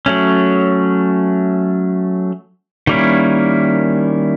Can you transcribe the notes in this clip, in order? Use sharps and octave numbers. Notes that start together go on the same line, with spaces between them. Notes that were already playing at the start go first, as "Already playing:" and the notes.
F#3 A3 C#4
D#3 G3 A#3 C#4 E4